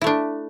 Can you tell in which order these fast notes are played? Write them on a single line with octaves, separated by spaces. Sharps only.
E4 A3 D4